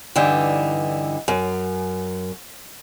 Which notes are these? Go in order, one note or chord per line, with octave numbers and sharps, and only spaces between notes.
G2 D3 E3 D#4
F#2